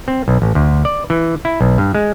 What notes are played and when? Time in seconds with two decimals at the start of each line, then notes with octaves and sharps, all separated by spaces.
0.08 C4
0.28 B1
0.42 A1
0.55 D2
0.85 D5
1.10 E3
1.45 E4
1.61 B1
1.78 G2
1.95 G#3